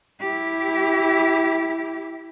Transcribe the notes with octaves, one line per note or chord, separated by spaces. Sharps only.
E4 G4